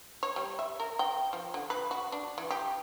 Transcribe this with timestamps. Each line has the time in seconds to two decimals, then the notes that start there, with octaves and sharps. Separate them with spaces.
0.23 C#5
0.36 G3
0.59 E5
0.80 A#4
0.99 G5
1.33 F3
1.54 D3
1.70 B4
1.91 F#4
2.12 D4
2.38 E3
2.51 G4